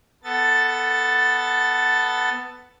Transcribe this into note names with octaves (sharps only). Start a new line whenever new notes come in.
B3 A4 A6